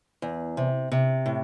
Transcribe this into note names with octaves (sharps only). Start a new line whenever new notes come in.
E2
C3
C3
A2